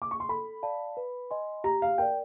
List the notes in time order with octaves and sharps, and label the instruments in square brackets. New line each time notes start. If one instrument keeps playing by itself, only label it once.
[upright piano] D6
C#6
C6
[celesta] A4 [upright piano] B5
[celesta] D5 F5 A5
B4
D#5 G#5 C6
[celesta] G4 [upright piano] A#5
[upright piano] F5
[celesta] A#4 D5 [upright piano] G5